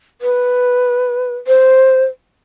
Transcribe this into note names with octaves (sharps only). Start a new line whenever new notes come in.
B4
C5